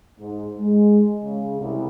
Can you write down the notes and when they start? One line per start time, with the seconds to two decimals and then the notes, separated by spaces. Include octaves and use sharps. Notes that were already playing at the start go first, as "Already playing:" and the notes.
0.20 G#2
0.59 G#3
1.23 C#3
1.59 C2